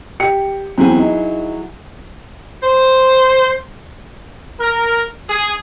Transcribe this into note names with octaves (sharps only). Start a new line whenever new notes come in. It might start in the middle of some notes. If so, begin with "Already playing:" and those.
G4 C#7
E2 F#3 C4 E4 G#4
D#4
C5
A#4
G#4